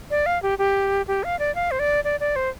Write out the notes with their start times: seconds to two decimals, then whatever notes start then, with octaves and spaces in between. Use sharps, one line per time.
0.11 D5
0.26 F5
0.43 G4
0.59 G4
1.08 G4
1.24 F5
1.39 D5
1.55 F5
1.71 C5
1.79 D5
2.04 D5
2.20 D5
2.36 C5